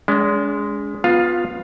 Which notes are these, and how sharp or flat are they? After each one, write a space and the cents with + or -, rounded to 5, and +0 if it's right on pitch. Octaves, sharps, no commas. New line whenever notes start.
G#3 +0 D4 -45
B3 +0 F4 +15 F5 +0